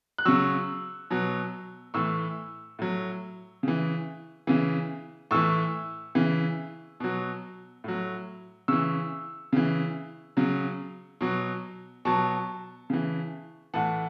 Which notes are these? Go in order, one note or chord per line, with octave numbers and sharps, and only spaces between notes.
F#6
C#3 F#3 C#6 E6
B2 F#3
A2 E3 C#6 E6
A2 F#3
C#3 E3
C#3 E3
A2 E3 C#6 E6
C#3 E3
B2 F#3
A2 F#3
C#3 E3 C#6 E6
C#3 E3
C#3 F#3
B2 F#3
B2 F#3 A5 C#6
C#3 E3
A2 E3 F#5 A5